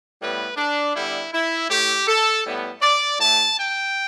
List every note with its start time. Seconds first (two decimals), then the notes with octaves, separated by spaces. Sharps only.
0.20 A2 G3 B3 B4
0.57 D4
0.95 D3 G3 B3 E4
1.32 E4
1.70 A2 A3 G4
2.07 A4
2.45 A2 G3 B3
2.81 D5
3.19 A2 A3 A5
3.57 G5